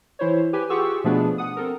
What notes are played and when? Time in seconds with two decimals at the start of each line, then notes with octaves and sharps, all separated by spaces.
0.19 E3 E4 C5 C#5
0.53 G4 B4 G#5
0.70 F4 G4 G#4 F#5 C#6 E6
1.04 B2 F3 A3 B3 D4 G#4
1.38 F#5 D#6
1.57 C4 A4 A#4